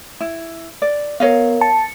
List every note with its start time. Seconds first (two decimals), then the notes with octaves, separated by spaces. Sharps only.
0.21 E4
0.82 D5
1.20 B3 A#4 C#5 D#5 F5
1.61 A5 C#7